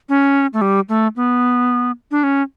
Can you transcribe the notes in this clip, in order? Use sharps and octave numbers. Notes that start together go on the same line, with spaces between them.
C#4
A3
G3
A3
B3
D4
C#4